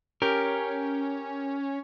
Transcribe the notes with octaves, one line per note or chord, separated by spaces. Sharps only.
C#4 G4 A#4